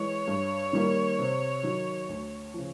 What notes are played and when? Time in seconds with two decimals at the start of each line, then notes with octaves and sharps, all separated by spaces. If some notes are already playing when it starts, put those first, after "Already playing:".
Already playing: E3 G#3 C#5
0.28 G2
0.73 D#3 G3 A#3
1.19 C3
1.63 D#3 F#3
2.09 D2
2.54 C#3 F3